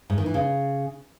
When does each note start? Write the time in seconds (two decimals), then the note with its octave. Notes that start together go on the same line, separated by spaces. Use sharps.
0.10 G#2
0.18 D#3
0.26 E3
0.34 C#3